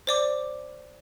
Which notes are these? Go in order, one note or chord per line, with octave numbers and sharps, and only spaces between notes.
C5 D5 D6